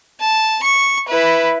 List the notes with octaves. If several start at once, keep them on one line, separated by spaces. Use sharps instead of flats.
A5
C#6
E4 B4